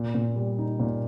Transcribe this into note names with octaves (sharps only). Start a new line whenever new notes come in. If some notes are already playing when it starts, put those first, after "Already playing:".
Already playing: A#2
A#2
G3
D#4
A#2